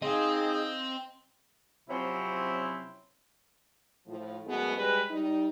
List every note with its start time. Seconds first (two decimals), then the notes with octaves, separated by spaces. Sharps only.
0.02 C4 D#4 G#4 D#5 F5
1.89 C3 F3 F#3 C4 C#4 E4
4.07 A2 F3
4.46 F#2 B2 G#3 A3 B3
4.77 G3 G#3 B4
5.11 G3 D#4